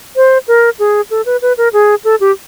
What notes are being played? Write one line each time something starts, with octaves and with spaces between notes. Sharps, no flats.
C5
A#4
G#4
A4
B4
B4
A#4
G#4
A4
G4